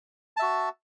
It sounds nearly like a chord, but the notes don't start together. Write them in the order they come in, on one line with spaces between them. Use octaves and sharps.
A5 E5 F#4